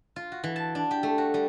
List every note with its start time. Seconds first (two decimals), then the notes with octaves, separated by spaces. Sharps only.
0.16 F4
0.32 F#4
0.44 E3
0.56 A5
0.75 D4
0.91 G4
1.03 A3
1.18 F#4
1.34 G3